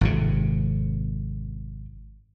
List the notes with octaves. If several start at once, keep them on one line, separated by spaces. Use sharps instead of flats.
G#1 F2 C3